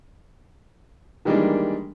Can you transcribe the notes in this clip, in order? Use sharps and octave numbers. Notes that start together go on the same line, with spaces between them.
D#3 E3 G3 G#3 A#3 D4